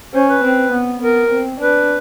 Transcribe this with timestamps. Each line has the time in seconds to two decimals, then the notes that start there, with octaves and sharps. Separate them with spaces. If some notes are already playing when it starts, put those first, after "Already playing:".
0.14 C#4 C5
0.29 B4
0.44 C4
0.72 B3
1.02 B3 A#4
1.30 C4
1.59 D4 B4